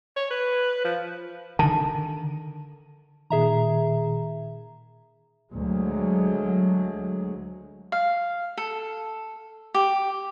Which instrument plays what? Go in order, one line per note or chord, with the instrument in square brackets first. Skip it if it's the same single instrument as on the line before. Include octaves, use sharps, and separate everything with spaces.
[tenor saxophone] C#5
B4
F3
[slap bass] D3 D#3 [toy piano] A5
[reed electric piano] A#2 D#3 [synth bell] G#4 E5 A#5
[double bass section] D2 F#3 G#3
[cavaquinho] F5
A4
G4